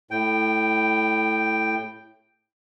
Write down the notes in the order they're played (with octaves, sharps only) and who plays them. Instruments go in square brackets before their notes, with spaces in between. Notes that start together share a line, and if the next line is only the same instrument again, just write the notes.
[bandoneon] A2 G5